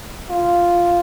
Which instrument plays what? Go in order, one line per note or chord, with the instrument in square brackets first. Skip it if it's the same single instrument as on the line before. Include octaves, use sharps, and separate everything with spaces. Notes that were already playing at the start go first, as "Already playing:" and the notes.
[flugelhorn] F4